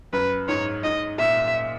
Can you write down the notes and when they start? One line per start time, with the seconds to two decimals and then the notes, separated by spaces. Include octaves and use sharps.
0.13 F#2 B4
0.49 G#2 C#5
0.84 G#2 D#5
1.19 A#2 E5